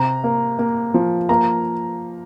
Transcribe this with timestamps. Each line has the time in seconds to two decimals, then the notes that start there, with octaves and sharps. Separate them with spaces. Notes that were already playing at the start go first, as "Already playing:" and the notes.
Already playing: C3 A#5
0.24 A#3
0.59 A#3
0.94 F3
1.29 A#3 A#5